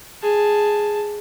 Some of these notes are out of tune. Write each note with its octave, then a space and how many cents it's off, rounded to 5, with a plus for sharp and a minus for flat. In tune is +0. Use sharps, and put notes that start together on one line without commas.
G#4 +0 A5 +0